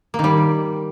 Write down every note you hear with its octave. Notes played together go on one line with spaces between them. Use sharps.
A#3
D#3
G3